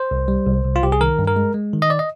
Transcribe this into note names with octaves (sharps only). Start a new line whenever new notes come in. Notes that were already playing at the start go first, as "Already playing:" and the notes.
Already playing: C5
C2
G3
C2
C2
F4
C2 G4
G#4
D#3 A#4
G2
A#4
G#3
G#3
D#3
D#5
D5
D#5